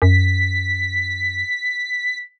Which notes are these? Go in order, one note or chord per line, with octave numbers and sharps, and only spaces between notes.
F#2 B6